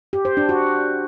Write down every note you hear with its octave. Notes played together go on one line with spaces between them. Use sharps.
G4
C5
D4
F#4